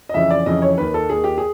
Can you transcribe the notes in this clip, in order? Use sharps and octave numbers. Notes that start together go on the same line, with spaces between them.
D#5
F2 C#3 E3 E5
D5
F2 C#3 E3 D#5
C#5
D#2 D#3 B4
A4
D#2 D#3 G#4
G4
G#4